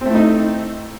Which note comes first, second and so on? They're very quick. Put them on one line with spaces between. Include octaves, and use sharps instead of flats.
C4 A3 E4 D#4